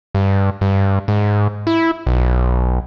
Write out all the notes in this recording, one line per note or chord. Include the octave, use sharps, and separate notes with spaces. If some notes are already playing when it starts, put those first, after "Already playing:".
G2
G2
G#2
E4
B1